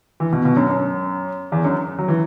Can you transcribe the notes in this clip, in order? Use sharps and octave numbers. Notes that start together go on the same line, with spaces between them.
E3
B2
B2
F#2
F#2
E2
F#2
F#3
E3